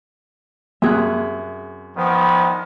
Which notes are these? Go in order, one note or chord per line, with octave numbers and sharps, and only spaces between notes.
F#2 C3 G#4 E5 F#6
C2 D#3 F3 B3